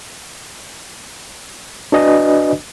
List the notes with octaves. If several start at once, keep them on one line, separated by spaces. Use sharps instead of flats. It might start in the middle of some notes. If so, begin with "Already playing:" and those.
D4 F#4 B4 D5 D#5 G#5